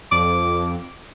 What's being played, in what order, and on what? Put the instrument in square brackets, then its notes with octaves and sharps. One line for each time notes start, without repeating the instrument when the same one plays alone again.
[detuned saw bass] F2 [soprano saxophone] D6